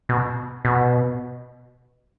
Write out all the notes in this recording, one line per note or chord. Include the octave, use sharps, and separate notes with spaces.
B2
B2